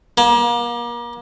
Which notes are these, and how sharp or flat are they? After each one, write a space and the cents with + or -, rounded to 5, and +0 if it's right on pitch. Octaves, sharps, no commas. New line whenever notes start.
A#3 +35